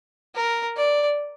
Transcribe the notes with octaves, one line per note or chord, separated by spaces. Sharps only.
A#4
D5